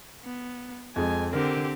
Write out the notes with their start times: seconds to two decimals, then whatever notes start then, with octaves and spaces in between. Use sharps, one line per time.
0.24 B3
0.96 F2 G#3 G#5
1.33 D3 C4 G4 A#4